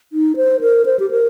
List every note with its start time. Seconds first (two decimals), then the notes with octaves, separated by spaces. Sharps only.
0.13 D#4
0.36 C5
0.61 A#4
0.85 C5
1.00 G4
1.11 A#4